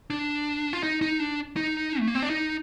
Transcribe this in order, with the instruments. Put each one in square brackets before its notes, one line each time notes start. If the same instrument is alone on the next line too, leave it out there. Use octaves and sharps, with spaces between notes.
[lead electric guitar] D4
F4
D#4
D#4
D4
D#4
A3
A#3
C4
D4
D#4